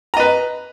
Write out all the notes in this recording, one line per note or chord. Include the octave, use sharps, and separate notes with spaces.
B4 D#5 A#5